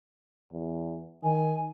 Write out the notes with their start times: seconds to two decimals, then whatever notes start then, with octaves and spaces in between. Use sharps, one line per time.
0.52 E2
1.23 D#3 G#5